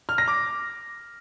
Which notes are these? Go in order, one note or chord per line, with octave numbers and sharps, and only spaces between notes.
F6
A#6
D6